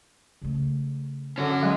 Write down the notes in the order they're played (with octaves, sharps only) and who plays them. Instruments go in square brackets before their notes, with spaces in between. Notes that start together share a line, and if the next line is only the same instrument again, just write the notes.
[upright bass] C#3 A3
[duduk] D3 [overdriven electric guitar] C#4 F#4
[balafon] F#3 [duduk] G#3